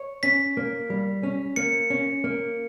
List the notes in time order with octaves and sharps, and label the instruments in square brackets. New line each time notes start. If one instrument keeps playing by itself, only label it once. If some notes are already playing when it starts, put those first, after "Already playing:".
Already playing: [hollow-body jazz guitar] C#5
[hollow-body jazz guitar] C#4 [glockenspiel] B6
[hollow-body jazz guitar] A#3
G3
C#4
[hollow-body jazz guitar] A#3 [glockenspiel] C#7
[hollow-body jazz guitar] C#4
A#3